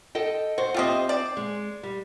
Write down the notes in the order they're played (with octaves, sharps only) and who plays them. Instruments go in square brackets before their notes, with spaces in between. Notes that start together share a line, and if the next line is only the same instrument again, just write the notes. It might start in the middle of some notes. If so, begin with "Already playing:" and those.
[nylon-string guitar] A4 D#5 G5
[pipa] F#4 [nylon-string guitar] C5
[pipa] A3 G4 D#5 [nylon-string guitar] C4 F4
[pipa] D5
[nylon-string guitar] G#3
G3